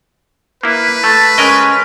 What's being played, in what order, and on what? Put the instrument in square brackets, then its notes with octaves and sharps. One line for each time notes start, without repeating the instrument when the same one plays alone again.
[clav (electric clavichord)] A#3 E4 [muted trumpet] B4
[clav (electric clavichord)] A3 [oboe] A5
[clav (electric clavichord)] G#3 A#4 D#5 [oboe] C#4